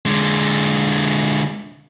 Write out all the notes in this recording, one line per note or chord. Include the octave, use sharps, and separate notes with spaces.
D3 G#3